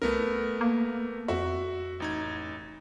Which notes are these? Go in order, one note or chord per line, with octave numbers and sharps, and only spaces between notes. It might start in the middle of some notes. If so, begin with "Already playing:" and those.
C2 A3 B3 A#4
A#3
F2 F#4 E5
A1 D#4 G#6